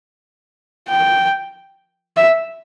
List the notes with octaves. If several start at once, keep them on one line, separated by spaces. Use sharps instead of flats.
G5
E5